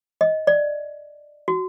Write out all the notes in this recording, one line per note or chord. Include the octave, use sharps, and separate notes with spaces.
D#5
D5
F#4